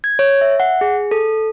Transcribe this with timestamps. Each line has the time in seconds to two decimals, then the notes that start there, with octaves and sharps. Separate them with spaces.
0.04 G#6
0.19 C#5
0.41 E5
0.60 F#5
0.81 G#4
1.11 A4